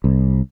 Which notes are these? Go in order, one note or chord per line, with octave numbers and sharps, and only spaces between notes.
C2